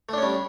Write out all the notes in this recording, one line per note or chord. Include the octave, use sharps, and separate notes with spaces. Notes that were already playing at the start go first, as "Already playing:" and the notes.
G3 A3 C#4 D4